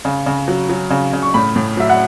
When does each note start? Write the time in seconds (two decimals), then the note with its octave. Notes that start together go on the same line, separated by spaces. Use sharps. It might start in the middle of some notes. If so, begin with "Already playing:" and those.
0.05 C#3
0.26 C#3
0.48 F#3
0.69 F#3
0.90 C#3
1.13 C#3
1.22 C#6
1.34 A2 B5
1.56 A2
1.77 F#3 E5
1.90 F#5